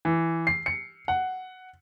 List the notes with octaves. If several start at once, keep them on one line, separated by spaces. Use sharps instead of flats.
E3
C7
C#7
F#5